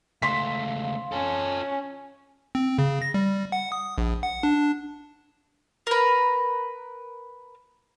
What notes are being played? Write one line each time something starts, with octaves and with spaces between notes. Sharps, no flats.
C#2 A3 F5 C6 B6
C#4 F4 A4
C4
C#3
A#6
G3
F#5
D#6
A#1
F#5
D4
A#4 B4